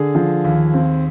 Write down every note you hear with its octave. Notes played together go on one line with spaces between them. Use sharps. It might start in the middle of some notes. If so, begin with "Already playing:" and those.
Already playing: D3 G#4
F3
D#2
C4